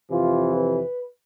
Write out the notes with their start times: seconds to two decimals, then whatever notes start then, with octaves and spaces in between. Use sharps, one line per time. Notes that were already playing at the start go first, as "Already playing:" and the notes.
0.10 F2 C3 E3 F4
0.55 B4